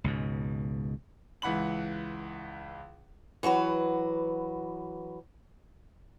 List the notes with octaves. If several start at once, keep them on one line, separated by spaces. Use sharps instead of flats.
C#2 G#2 B2
C#2 E3 F#5 B5 F#7
E3 F#3 F#4 B4